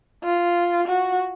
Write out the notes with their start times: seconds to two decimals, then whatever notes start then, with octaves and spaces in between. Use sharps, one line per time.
0.24 F4
0.88 F#4